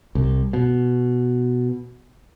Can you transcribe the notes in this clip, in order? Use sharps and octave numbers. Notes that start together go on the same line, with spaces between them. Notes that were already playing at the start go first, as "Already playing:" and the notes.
C2
B2